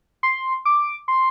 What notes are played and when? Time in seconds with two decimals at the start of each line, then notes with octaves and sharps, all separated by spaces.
0.23 C6
0.65 D6
1.08 C6